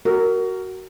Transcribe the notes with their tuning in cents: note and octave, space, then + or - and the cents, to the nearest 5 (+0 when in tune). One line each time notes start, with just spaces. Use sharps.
F#4 +20 A#4 -10